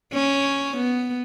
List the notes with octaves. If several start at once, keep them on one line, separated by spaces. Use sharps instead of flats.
C#4
B3